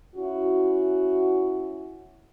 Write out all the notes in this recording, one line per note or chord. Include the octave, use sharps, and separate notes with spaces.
C#4 E4 F#4